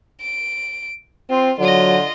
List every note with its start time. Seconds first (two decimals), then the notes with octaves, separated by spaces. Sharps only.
0.21 D7
1.30 C4 F4
1.59 D3 F#3 F4 D#5